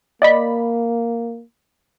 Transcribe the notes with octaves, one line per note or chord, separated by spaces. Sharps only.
A#3 D5 D#5 B5